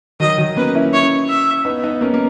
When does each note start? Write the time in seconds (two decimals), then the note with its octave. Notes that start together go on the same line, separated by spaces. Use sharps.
0.20 D#3 F#3 D#5
0.38 D#3 F#3
0.56 A#3 C#4 B4
0.75 C#4 E4
0.93 C#4 E4 C#5
1.29 E5
1.65 B3 D#4
1.83 B3 D#4
2.01 A#3 C#4
2.14 A#3